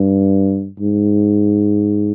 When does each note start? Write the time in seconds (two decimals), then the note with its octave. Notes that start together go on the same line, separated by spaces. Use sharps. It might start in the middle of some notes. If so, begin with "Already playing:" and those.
Already playing: G2
0.80 G#2